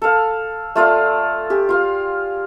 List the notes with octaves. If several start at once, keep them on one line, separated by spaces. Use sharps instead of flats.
A4 F5
A3 F4 D5 F5
G4 G#4
F4 F5